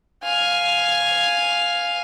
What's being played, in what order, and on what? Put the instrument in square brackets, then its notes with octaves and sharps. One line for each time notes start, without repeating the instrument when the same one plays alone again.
[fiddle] F5 G#5